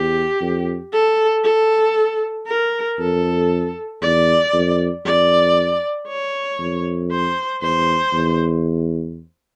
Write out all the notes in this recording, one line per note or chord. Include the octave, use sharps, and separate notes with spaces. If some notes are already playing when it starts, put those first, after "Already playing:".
Already playing: E2 G4
F2
A4
A4
A#4
F2 A4
E2 D5
F2
F2 D5
C#5
F2
C5
E2 C5
E2